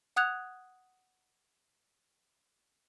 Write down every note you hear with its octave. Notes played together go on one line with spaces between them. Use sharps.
F#5 D#6 F#6 G#6 F7